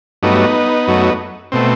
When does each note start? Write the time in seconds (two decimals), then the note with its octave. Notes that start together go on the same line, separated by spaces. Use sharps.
0.23 G2 F#3 A3 B3 D#4
0.87 F#2 F#3 A3
1.52 B2 A3 C4